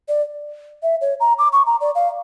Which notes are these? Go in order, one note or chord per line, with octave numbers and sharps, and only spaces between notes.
D5
E5
C#5
A#5
D6
C#6
A#5
D5
F5